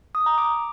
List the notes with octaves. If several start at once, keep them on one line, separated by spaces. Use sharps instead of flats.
D#6
A#5
D6